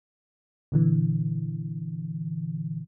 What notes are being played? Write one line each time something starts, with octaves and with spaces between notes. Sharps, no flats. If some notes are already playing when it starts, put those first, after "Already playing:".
A#2 D3 E3